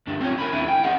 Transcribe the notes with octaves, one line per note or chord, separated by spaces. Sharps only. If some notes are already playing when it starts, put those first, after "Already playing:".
D2 G2 D4
C4 C#4 F4 B4 C#5
A#4 G#5 B5
D#2 C4 D4 E4 G#5
G5
B3 C#4 G#4 F#5